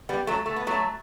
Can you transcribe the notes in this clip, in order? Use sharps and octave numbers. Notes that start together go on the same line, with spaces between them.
G3 B3
F#3 A3
A3
B3
F#3 A3